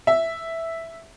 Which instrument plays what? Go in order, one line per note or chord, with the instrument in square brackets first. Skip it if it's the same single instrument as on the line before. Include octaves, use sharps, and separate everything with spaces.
[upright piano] E5